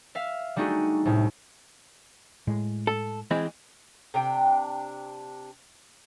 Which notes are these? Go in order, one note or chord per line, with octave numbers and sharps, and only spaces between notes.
E5 F5
G3 A3 D4 D#4 F#4 G#4
C2 A2
A2 G#3
A4
E3 G#3 C4
C3 D4 G5